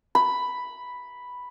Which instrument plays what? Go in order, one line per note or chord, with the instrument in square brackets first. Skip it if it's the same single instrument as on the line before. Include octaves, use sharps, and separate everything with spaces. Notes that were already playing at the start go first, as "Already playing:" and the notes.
[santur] B5